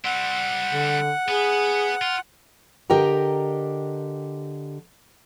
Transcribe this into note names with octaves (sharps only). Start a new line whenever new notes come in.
G3 C4 F#5
D3
B3 G#4
F4
D3 G4 A#4 D#5 G5 A#5